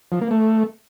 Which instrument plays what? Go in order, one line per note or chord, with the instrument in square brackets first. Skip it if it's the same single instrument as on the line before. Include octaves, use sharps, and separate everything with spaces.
[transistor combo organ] F3
A#3
A3